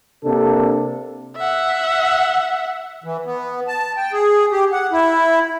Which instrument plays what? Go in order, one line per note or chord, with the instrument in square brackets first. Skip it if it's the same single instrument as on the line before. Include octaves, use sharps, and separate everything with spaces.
[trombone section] C3 A#3 D4 A4
[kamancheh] E5 F#5
[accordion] E3
B3
A5
G5
G#4
G4
F#5
E4